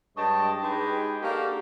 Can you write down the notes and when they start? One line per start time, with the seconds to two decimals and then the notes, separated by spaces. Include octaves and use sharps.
0.16 G2 G#3 C#5 D#5 G5 A5
0.61 G#3 D#4 G4 G#4 B4 G5
1.22 A#3 D4 F#4 G4 A4 F5